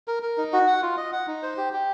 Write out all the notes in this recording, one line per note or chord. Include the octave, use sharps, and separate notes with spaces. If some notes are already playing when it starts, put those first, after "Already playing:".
A#4
A#4
D#4
F#4
F#5
F4
D#5
F#5
D#4
C5
G4
G4